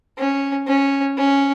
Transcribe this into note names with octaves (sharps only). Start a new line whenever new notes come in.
C#4
C#4
C#4